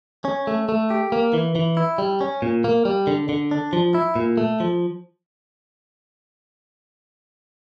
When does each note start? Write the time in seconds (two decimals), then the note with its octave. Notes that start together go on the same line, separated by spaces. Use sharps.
0.25 C#4
0.47 A3
0.69 A3
0.90 G4
1.12 A#3
1.34 E3
1.55 E3
1.77 E4
1.98 G3
2.21 C#4
2.42 A#2
2.64 A#3
2.85 G3
3.07 D3
3.29 D3
3.51 D4
3.73 F3
3.94 E4
4.16 A#2
4.37 A3
4.60 F3